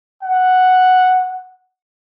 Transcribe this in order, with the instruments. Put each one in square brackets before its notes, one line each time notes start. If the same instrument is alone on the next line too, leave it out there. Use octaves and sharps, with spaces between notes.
[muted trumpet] F#5